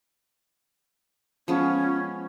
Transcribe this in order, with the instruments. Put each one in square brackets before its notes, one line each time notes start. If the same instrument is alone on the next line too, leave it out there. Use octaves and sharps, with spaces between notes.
[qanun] F3 G#3 B3 [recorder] C#4